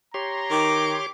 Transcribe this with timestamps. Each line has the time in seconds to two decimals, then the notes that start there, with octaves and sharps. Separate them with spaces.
0.14 G4 C#5 A#5 C6
0.51 D#3 D6